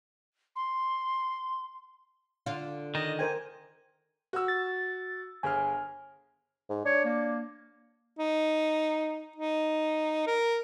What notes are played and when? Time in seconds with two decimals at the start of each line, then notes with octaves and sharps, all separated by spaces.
0.56 C6
2.46 D3 F4
2.95 D#3 D#5
3.19 A#4 C5 G5 G#5
4.33 F#4 E6
4.48 A6
5.43 G1 G#4 G#5 F6
6.70 G#2
6.85 D4 C#5
7.05 A#3
8.19 D#4
9.36 D#4
10.27 A#4